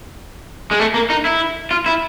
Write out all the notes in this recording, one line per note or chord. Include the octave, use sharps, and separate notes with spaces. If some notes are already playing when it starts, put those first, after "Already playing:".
G#3
A3
A#3
D#4
E4
F4
E4